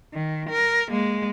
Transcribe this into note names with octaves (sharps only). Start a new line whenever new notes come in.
D#3
A#4
G#3 A#3